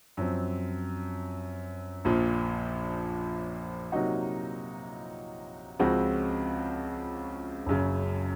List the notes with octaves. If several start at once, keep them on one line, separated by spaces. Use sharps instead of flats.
F#2 F3 C4
A#1 A#2 F3
C3 F#3 A#3 D#4 F#4
C#2 C#3 F3 C4 F#4
F#1 F#2 C#3